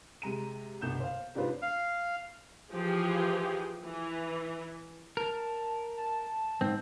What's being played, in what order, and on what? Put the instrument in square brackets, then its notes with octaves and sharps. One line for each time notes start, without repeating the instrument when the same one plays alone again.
[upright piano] C3 G#3 A#5 D#7
G1 C2 B2 G6 E7
C5 F5
G#2 C3 D4 F4 B4 C5
[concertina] F5
[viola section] E3 F3 G4 G#4
E3
[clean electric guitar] A#4 [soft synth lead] A5
[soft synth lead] A5
[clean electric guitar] G#2 C4